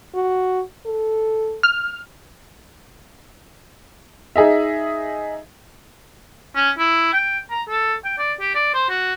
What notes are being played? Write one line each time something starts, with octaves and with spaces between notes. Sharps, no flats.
F#4
A4
F6
D#4 G#4 D#5 E5
C#4
E4
G5
A#5
A4
G5
D5
G4
D5
C5
F#4